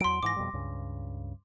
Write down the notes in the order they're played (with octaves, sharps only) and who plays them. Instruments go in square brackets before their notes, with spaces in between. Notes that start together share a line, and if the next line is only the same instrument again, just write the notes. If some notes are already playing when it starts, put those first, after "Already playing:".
[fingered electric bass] E2 F#3 [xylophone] C6 D7
[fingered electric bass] G#2 E3 [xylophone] D6 A#6
[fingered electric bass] F2 B2 G3
C#2 G2 C#3